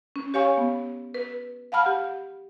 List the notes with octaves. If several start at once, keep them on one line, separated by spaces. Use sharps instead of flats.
C#4
G4 C#5 F5 G#5 C#6
B3
B4
F5 F#5 A5 B5 F6
G4